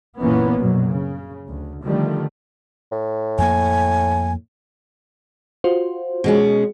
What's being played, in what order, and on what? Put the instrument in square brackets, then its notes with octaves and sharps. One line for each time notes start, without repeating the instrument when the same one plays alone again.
[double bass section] F#1 A#2 E3 A#3 B3 C#4
A#1 F#2 B2 F#3
C#3
D2
D3 D#3 F3 G3 A3
[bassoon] A2
[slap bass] F2 A#3 [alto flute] G#5
[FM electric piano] F4 F#4 C5
[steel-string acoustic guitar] B2 G#3 C#4